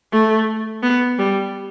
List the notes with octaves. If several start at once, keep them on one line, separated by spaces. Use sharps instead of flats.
A3
B3
G3